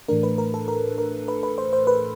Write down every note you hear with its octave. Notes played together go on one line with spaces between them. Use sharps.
A2 E3 A3 D4 A#4
B4
A#4
A4
A#4
A#4
B4
B4
C5
C5
B4